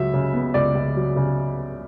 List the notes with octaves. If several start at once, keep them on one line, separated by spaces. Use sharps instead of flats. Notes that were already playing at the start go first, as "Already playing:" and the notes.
Already playing: C#2 F#3 E5
C#3
B3
C#2 D5
C#2
F#3
C#3